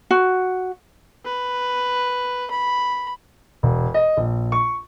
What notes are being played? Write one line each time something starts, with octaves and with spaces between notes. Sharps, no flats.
F#4
B4
B5
E1
D#5
A#1
C#6